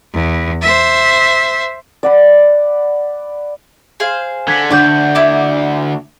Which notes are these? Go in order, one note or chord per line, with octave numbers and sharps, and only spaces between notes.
E2
C5 E5
D5 F#5 B5
G#4 C5 F5
D3 G#6 B6
D2 G#2 D4 F#4 D5 F#5 G6
E4 D6